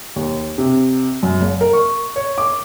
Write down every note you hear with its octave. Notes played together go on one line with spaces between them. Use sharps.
D#2
C3
F#2
F#1
A#4
C#6
C#5
D6